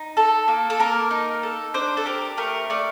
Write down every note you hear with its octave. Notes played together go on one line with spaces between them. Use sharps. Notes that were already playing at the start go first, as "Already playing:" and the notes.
Already playing: D#4
A4
A#3
A4
A#3 A#4
D#4
A4
D4 C5
A4
G4 A#4
A3 A#4
A3 D5